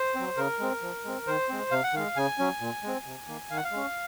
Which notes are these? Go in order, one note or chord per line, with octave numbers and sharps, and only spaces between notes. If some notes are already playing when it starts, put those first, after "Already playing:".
Already playing: C5
F#3 C4
C#3 A#4
G#3 C4
F3
G#3 C4
D#3 C5
G#3 C4
C3 F5
F#5
D#3 G#3 F5
C#3 G#5
F#3 C#4
A#2
G#3 C4
C3
D#3 A#3
D#3 F5
F#5
F5
G#3 C#4